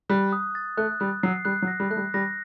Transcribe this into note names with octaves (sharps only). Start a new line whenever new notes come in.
G3 F#6
D#6
A6
A3 F#6
G3 F#6
F#3 C7
G3 F#6
F#3
A#6
G3
A3 F#6
G3
G3 A#6